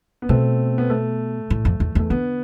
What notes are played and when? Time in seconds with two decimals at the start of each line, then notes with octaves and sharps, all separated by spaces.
0.22 B3
0.29 B2 A3 C4
0.78 B3
0.90 A3
1.50 A2
1.65 F2
1.80 E2
1.95 E2 A3
2.10 D3 B3